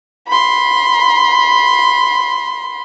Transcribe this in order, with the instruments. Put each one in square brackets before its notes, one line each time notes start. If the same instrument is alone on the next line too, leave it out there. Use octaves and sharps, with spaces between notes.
[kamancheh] B5 C6